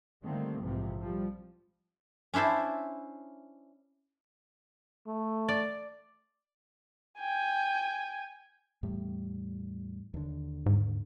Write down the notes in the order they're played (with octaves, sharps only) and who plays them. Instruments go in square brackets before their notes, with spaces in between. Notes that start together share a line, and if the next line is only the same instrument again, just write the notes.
[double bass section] D3 D#3 G3 A3 A#3 C4
A#1 F2 G#2 C3 E3 F3
F3 G3
[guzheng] C#4 D4 E4 C5 A5
[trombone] A3
[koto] D5
[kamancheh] G5 G#5
[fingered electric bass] E2 A2 G3
D#2 D3
[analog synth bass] G#2